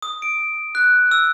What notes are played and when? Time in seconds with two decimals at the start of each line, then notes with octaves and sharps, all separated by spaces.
0.02 D#6
0.22 D7
0.75 F#6
1.11 E6